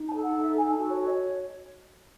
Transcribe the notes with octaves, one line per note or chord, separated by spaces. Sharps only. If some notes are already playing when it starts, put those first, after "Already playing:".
Already playing: D#4
A5
A4
F#5
D#4
E5
A4 G#5
A5
F#4
C#5
C#5
D#5